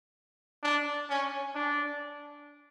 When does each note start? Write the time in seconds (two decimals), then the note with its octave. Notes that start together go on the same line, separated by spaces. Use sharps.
0.63 D4
1.09 C#4
1.55 D4